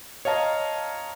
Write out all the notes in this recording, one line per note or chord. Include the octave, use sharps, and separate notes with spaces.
C#5 D#5 F5 A5 A#5